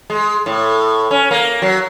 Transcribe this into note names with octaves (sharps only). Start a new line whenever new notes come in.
G#3
A2
C#4
A#3
F#3